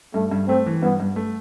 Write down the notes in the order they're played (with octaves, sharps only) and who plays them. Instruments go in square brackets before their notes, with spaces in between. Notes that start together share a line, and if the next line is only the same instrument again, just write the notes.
[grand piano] G2 [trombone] A3
[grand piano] G2
[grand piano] A3 [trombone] C4
[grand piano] E3
[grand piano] G2 [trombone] B3
[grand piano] G2
A3